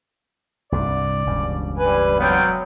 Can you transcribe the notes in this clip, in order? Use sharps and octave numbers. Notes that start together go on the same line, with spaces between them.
C2 G2 D5
E1 C#2 G2
G3 B4 G#5
F#3 B3 C4 F5 G5